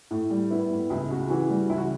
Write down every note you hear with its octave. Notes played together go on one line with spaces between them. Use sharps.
A2
G3
B3 E4
A2
C#2 E4
C#3 F#4
E3 F#4
G3
C#2 E4
F#4